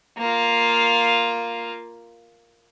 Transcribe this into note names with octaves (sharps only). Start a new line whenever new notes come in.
A#3 F4